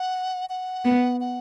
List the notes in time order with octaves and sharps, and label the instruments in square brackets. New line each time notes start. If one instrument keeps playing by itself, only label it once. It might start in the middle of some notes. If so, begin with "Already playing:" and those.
Already playing: [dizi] F#5
F#5
[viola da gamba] B3
[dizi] F#5